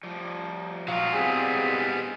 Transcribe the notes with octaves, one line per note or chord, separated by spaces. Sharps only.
F3 G3
A#2 E3 F#3 G#3 F4 F#4 F5
G3 B3 C4 G#4